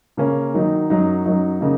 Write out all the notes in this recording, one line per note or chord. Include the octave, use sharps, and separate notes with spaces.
C#3 A#3 C#4
D#3 F#3 D#4
F#2 F#3 D#4
F#2 F#3 D#4
C#3 A#3 D#4